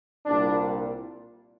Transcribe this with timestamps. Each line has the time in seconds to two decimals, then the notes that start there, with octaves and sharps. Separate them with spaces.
0.26 C2 A#2 G3 D4